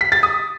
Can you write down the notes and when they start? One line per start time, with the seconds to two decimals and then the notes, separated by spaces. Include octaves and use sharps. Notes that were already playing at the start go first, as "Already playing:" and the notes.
0.01 B6
0.12 A6
0.23 D#6